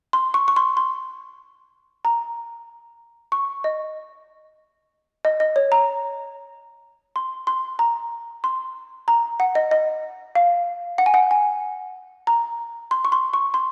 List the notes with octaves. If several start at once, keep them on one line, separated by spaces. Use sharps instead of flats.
C6
C#6
C#6
C6
C6
A#5
C#6
D#5
D#5
D#5
C#5
A#5
C6
C6
A#5
C6
A#5
F#5
D#5
D#5
F5
F#5
G#5
F#5
G#5
A#5
C6
C#6
C6
C#6
C6